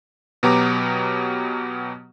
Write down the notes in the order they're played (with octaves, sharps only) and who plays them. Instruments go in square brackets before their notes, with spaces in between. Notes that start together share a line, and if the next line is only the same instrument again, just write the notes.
[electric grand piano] B2 F#3 B3 G4 A#5 D6